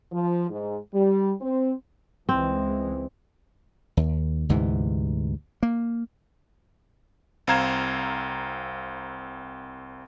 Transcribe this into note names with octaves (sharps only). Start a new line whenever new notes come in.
F3
G#2
G3
C4
C#2 E3 G#3 C4
D#2
D2 G#2 C3 E3
A#3
C2 C4 F5 A#5 G#6 E7